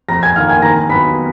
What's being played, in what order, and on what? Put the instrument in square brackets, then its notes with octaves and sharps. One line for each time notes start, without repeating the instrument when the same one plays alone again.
[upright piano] F2 [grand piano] A#5 A#6
[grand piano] G#5 G#6
[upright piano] D#3 A#3 [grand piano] F5 F6
[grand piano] G#5 G#6
[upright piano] D#3 [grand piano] A#5 A#6
[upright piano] F#3 B3 [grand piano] B5 B6